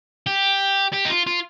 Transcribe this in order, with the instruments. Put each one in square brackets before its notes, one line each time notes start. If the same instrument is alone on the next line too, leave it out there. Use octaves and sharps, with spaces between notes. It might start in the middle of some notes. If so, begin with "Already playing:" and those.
[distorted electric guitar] G4
G4
D#4
F4
F4